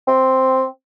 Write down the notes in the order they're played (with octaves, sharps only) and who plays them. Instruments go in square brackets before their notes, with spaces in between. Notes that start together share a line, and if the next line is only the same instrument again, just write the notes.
[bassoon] C4